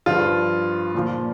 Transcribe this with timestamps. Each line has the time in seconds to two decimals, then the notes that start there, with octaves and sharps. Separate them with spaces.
0.06 G2 F3 F4
0.94 A#2 F3